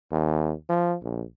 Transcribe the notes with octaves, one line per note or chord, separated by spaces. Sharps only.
D#2
F3
A#1